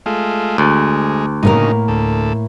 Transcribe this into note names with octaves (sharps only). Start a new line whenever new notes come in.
G#3 A3 F4
D2 G#3
A2 C#3 A#3 D#4 A#4
D2 A4